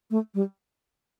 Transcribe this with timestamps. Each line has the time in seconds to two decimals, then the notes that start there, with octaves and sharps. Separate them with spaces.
0.11 A3
0.35 G3